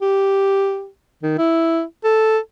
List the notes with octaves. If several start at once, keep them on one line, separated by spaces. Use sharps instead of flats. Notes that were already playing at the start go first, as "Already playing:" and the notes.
G4
D#3
E4
A4